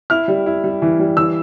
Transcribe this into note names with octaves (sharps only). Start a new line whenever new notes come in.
E4 F6
G3
E4
G3
E3
G3
E3 E6